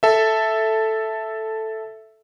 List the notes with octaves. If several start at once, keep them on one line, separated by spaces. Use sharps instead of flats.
A4 E5